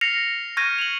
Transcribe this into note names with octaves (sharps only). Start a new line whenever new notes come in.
F6 A#6 C7 C#7 F7
C#6 F6 G6 G#6 A#6 D#7
F7 F#7